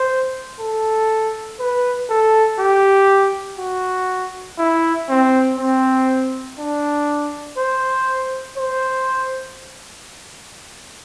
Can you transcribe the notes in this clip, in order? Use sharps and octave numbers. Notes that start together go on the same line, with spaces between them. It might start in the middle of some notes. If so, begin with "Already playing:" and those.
Already playing: C5
A4
B4
A4
G4
F#4
E4
C4
C4
D4
C5
C5